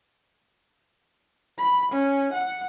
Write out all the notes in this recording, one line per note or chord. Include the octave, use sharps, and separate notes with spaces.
B5
C#4
F#5